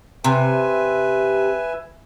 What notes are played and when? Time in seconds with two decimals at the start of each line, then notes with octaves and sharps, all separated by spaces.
0.24 C3 B4 E5 G#5